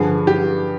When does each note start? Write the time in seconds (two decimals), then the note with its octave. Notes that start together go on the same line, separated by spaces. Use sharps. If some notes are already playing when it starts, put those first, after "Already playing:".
Already playing: G2 D3 F3 G#4
0.27 G4